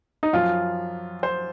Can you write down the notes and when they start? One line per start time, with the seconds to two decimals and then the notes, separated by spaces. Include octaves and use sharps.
0.23 D#4
0.33 F#2 F3 F4
1.23 C5